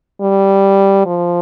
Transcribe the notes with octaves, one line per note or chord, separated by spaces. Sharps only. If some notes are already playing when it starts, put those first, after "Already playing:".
G3
F3